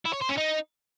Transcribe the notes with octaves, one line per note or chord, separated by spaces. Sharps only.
E4
C#5
C5
C#4
D#4